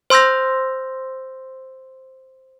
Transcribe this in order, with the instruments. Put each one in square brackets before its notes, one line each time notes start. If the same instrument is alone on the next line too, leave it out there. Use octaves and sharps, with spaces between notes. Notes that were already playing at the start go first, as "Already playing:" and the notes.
[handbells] C5 C6 E6 G6 A#6